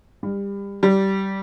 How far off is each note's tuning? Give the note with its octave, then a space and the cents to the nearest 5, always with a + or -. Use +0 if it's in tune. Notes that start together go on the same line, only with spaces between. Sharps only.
G3 +25
G3 -20